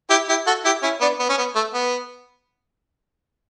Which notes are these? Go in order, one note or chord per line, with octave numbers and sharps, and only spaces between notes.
E4 G4
E4 G4
F#4 A4
E4 G4
C#4 E4
B3 D4
B3
C#4
B3
A3
B3